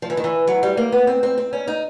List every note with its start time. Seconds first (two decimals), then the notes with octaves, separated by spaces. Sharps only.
0.02 F3
0.10 E3
0.17 D#3
0.24 E3
0.47 F#3
0.63 G3
0.77 A#3
0.92 B3
1.07 C4
1.23 C4
1.38 C4
1.53 C#4
1.67 D#4